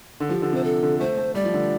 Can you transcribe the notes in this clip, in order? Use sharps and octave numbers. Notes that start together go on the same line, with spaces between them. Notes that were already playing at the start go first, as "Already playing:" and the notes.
D3
F3 G4
D3
C3 C5
A4
D3
A3 C5
A3
G3 D5
F3
D3